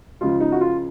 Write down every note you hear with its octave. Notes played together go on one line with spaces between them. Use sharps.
C#2 C#3 F3 F4
D#4
F#4
F4